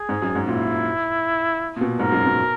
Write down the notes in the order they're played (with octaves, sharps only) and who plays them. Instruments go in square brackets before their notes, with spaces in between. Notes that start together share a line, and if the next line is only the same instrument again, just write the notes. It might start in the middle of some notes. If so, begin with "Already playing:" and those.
Already playing: [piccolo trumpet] G#4
[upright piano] G#2
F#2
G#2
[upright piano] A#2 [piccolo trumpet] E4
[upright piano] A#2
B2
[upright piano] G#2 [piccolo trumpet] A#4
[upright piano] F#2
B2